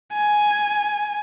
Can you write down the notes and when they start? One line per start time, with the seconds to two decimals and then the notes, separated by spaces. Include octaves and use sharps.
0.14 G#5